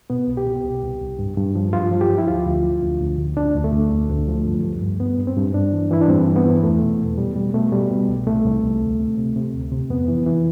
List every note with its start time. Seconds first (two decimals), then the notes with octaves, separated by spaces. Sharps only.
0.10 B2 B3
0.28 C2
0.37 G4
0.46 B2
0.64 C2
0.83 C2
1.01 C2
1.19 G2
1.37 G2
1.55 F3
1.73 G2 F4
1.92 F3
2.01 G4
2.10 F3
2.18 E4
2.27 D2 F4
2.46 D2
2.64 F3
2.82 D2
3.00 D2
3.18 D2
3.37 D2 D4
3.54 D2
3.64 A3
3.73 D2
3.91 D2
4.10 D2
4.28 F3
4.45 G2
4.64 G2
4.82 G2
5.00 G2 B3
5.18 G2
5.27 C4
5.36 G2
5.54 G2 D4
5.73 E3
5.91 E3 E4
6.01 D4
6.09 G2 C4
6.27 E3
6.36 B3
6.45 E3
6.63 E2 A3
6.82 B2
7.00 E2
7.18 B2 G3
7.36 B2 G3
7.54 B2 A3
7.72 B2 G3
7.91 B2
8.08 C2
8.27 C2 A3
8.44 C2
8.63 C2
8.81 D2
8.99 C3
9.17 C3
9.36 C3
9.54 D2
9.72 C3
9.90 F2 B3
10.08 E3
10.26 E3